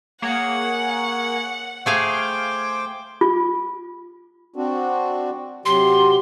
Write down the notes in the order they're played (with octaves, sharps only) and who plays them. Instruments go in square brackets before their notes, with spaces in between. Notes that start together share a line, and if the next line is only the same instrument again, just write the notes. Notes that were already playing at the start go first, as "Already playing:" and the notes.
[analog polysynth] A#3 G#4 C#5 [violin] F#5
[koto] A3 G#4 F5 [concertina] C5 G5 D6 [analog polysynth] G#5
[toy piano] F4
[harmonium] C4 D4 F#4
[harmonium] C3 F#3 G4 [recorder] C6